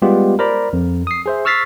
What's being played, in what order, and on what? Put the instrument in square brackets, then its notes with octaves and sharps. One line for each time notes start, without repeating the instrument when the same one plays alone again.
[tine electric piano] G3 G#3 B3 F4 G4
A#4 C5 D5 A#5 B5
F2
D#6 C7
G#4 C5 E5
C#6 E6 F6 A6 B6 C7